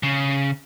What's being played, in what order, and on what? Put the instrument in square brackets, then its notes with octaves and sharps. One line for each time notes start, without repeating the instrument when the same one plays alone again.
[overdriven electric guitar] C#3